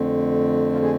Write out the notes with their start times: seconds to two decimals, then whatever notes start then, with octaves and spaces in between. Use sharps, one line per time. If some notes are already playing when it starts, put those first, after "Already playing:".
Already playing: F2 D3 A3 C4
0.72 F4
0.82 G#4